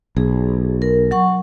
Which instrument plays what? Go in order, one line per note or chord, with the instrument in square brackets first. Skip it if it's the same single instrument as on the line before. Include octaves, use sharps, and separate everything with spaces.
[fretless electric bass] B1 [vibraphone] G#4
[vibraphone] A#4
F#3 F#5 C#6